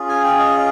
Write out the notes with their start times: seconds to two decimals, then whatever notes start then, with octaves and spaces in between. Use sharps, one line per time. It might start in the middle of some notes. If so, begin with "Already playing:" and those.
Already playing: C#4 F4 G#4
0.09 G#5
0.24 G5
0.39 D#5